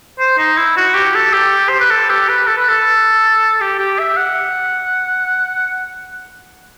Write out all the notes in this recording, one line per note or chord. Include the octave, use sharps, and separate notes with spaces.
C5
D#4
E4
F#4
G4
A4
G4
C5
B4
A4
G4
B4
A4
B4
A4
G4
G4
E5
F#5